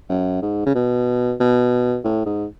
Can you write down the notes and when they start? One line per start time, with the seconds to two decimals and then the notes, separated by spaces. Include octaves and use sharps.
0.09 F#2
0.42 G#2
0.66 C#3
0.75 B2
1.40 B2
2.04 A2
2.26 G#2